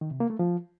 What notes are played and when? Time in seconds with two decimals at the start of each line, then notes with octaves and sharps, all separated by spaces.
0.01 D#3
0.11 C3
0.20 A#3
0.30 A3
0.39 F3